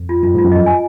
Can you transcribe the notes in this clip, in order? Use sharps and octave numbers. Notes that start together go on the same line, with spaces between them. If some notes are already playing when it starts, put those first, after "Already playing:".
Already playing: F2
F4
F#2 F4
G#2 F4
F#2
F2 D#5
G#5